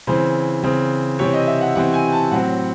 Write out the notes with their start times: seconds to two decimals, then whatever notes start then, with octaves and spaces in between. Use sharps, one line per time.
0.07 C#3 E3 C4 C5
0.63 C#3 E3 C4
1.19 C3 E3 C4 C#5
1.33 D#5
1.47 E5
1.61 F#5
1.75 C3 E3 C4 F#5
1.94 G#5
2.12 A5
2.31 A2 F#3 C4 F#5